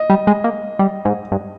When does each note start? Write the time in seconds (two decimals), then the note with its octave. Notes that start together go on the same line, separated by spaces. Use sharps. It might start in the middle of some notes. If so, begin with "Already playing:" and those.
Already playing: D#5
0.10 G3
0.27 G#3
0.44 A#3
0.79 G3
1.05 G#2
1.32 G2